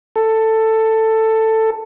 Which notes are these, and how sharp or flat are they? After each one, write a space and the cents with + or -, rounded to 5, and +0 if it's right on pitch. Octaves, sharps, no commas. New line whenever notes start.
A4 +10